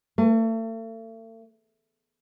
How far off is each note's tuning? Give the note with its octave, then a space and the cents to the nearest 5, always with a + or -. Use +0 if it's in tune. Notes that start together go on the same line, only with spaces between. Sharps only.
A3 +40